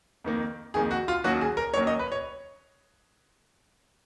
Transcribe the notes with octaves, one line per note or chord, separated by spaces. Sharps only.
F2 D#3 A#3
F2 D#3 A#3 G#4
F#4
F4
D#2 D#3 F#3 A#3 C#4 F#4
G#4
A#4
D#2 D#3 F#3 A#3 C#4 C#5
D#5
B4
C#5